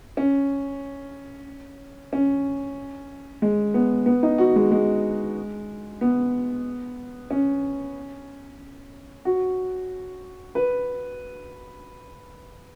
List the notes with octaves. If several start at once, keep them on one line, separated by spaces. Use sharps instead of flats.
C#4
C#4
G#3
B3
B3
D#4
F#4
G#3
G#3
B3
C#4
F#4
B4